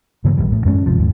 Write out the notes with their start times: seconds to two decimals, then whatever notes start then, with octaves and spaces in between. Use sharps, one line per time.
0.24 G2 C#3 E3 A#3
0.37 A#1 D#2 D#3 G3
0.52 A2
0.65 F#2 G#3 A#3 C#4
0.86 G1 C3 F3
0.98 D#2 G#2